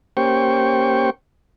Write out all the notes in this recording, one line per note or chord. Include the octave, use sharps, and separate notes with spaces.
A#3 C#4 G4 C5 G5 C#6